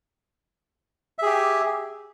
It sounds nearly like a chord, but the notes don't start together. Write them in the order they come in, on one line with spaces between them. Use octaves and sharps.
E5 G#4 G4